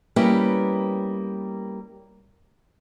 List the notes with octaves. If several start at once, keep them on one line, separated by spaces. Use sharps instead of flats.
G3 A#3 B3 C#4 E4